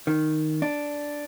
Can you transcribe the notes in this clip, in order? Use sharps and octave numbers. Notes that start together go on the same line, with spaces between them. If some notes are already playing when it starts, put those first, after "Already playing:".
D#3
D4